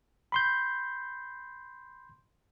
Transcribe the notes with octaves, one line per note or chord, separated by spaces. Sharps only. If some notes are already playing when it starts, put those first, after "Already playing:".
B5 C6 G6